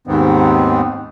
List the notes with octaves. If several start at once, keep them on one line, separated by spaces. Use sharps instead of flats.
D#2 G#2 D#3 B3 C4